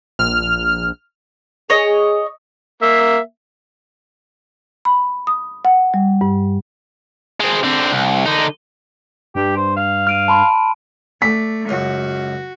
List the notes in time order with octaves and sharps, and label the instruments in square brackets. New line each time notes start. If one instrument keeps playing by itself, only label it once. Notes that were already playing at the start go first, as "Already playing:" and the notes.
[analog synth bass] A#1 [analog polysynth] F6
[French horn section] G#4 [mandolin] C#5 D#5
[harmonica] A#3 E5
[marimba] B5
D#6
F#5
G3
G2
[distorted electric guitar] G#3 C4
D3 C4
C2
D3 D#4
[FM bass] G2 [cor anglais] G4
[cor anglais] C5
F5
[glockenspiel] F6 D7 D#7
A5 B5 C6
[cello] A3 [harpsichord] D5 [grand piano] B6
[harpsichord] C#2 F#2 [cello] F#4